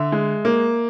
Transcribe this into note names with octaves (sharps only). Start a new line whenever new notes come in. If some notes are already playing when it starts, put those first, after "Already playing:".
Already playing: D3 E5
G#3
A#3